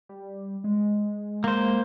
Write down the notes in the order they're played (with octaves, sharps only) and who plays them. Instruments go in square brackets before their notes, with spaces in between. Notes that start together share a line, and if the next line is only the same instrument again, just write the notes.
[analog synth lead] G3
G#3
[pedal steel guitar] A#3 C5